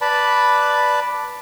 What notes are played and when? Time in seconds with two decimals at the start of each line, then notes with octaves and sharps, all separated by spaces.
0.01 B4 D5 A5 B5